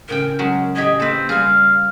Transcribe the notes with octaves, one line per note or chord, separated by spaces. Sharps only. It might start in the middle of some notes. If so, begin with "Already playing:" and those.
A2 C#3 A#4 G5
F#3 G#3 C#4
A2 G4 G#4 D#5
A#3 C4 A4 B4
G3 G#4 F5